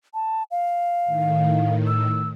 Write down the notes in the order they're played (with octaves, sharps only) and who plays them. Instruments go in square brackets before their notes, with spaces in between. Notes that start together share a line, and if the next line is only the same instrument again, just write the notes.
[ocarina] A5
F5
[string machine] A2 D#3
[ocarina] E6